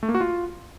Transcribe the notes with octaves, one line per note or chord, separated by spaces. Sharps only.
A3
A#3
F#4
F4